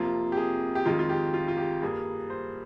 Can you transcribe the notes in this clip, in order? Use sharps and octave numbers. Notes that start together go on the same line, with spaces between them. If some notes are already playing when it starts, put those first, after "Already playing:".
Already playing: F2 C3 F3 A#3 F4
G4
G#4
G4
F2 D#3 G#3 F4
F4
G4
F4
F4
G4
G2 G3 A#3 G#4
C5